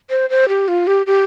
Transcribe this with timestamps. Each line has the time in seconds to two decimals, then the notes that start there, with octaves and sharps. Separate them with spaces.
0.10 C5
0.30 C5
0.49 G4
0.68 F4
0.87 G4
1.06 G4